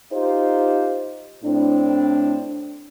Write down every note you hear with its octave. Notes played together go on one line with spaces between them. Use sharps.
D#4 F4 G4 C5
A2 C4 D4